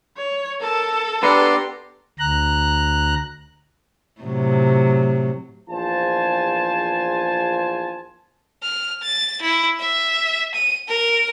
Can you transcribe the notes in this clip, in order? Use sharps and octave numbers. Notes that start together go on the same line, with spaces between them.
C#5
A4 A#4 A5
B3 D4 G4 B4 A#5 C6
D2 A#5 F#6
A2 C3 F#3
A#1 E2 F4 C5 G#5 A5
F6
A6
E4
E5
D#7
A#4